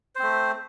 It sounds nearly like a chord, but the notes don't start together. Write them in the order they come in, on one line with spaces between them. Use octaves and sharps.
C5 C4 A3